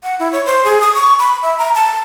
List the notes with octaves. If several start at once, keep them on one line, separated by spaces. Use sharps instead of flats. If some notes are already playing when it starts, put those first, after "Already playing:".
F#5
E4
C#5
C5
G#4
D#6
C#6
B5
E5
A#5
A5